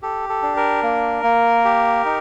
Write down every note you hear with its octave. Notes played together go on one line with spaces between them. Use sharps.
G4 A4
A4
D4
A#4
A#3
A#3
G4
D#4